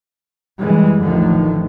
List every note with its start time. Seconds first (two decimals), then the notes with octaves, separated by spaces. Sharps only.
0.59 F#2 E3 G3 G#3
1.03 A1 D#2 A2 D3 D#3 F3